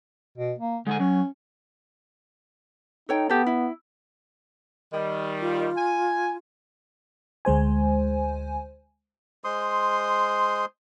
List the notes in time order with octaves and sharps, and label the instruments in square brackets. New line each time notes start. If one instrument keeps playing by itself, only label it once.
[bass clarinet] B2
A#3
[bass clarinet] D3 [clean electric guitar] G#3 D#4 G#5
[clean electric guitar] F#3 [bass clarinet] C#4
[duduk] D#4 [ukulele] A4 C#5 G5
[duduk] B3 [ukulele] G4 A4
[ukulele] E4
[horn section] D#3 G3
[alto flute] F4
[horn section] G#5
[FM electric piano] D2 G#3 C5 G#5
[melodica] G#3 C5 C6 D#6